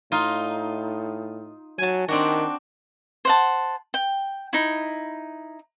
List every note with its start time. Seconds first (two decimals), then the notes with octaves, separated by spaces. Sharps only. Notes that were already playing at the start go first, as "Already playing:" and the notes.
0.12 A2 D#4 F4
1.78 F#3 G#5 A5
2.08 D#3 C4 D4 F#4
3.25 C5 F#5 A5
3.94 G5
4.53 D#4 E4